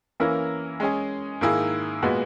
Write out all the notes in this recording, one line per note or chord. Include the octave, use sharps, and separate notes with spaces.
E3 A#3 C#4 E4 A#4
G#3 C#4 G#4
G#2 D#3 A#3 E4 G#4
A#2 G#3 B3 F#4 B4